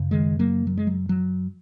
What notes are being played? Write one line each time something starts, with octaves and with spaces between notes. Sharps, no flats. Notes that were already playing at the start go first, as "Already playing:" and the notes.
Already playing: F#2 C#3
D#3 G#3
F#3 A#3
F#3
G#3
F#3
F#3